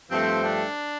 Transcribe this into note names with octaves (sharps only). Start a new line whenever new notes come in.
G2 F3 A3 C4
D4